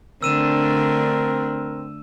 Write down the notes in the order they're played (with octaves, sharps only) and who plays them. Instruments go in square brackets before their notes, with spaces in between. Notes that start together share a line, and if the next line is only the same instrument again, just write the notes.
[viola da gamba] D3 A3 D4 [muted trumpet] C4 [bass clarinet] A#4 [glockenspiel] E6 D#7 E7